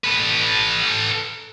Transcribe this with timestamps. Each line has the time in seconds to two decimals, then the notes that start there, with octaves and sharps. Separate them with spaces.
0.04 A4 B4